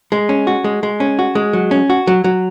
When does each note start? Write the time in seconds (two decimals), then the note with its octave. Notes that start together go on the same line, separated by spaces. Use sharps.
0.12 G#3
0.29 C#4
0.47 F#4
0.64 G#3
0.83 G#3
1.00 C#4
1.19 F#4
1.35 G#3
1.53 F#3
1.71 C#4
1.90 F#4
2.07 F#3
2.24 F#3